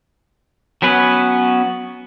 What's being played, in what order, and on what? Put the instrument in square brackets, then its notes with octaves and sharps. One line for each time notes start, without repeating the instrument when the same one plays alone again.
[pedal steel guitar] F#3 B3 C#4 B4